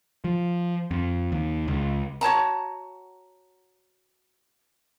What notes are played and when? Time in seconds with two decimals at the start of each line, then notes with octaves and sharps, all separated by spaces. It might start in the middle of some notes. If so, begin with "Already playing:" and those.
0.24 F3
0.91 F2
1.32 D#2
1.68 C#2
2.21 F#4 C#5 A5 A#5